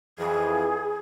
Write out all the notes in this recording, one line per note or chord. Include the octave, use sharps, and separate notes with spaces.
F2 E3 G#4